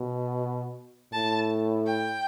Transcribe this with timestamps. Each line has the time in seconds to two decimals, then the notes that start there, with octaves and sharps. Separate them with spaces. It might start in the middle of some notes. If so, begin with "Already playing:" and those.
Already playing: B2
1.12 A2 A5
1.87 G5